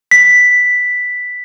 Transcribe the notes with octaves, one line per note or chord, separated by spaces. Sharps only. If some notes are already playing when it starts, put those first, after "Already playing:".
B6